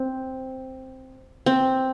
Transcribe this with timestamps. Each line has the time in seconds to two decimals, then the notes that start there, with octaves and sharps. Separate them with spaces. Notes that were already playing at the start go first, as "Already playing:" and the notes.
Already playing: C4
1.46 C4